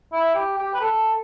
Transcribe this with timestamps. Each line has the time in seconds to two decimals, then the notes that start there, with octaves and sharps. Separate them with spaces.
0.12 E4
0.35 G4
0.58 G4
0.74 B4
0.80 A4